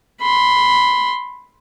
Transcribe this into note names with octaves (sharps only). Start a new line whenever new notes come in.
B5 C6